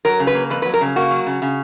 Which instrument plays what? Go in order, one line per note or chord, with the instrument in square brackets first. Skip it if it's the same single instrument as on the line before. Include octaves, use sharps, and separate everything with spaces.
[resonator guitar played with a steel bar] F#3 A#4
C#3
B4
A#3
F2 B4
B4
F#3
A#4
C#3
A#3 F#4
F#3
C#3
C#3